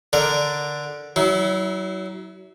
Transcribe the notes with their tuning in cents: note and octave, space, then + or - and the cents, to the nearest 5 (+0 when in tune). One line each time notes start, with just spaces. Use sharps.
D3 +0 A#4 +0 D5 +0
F#3 +30 E4 -25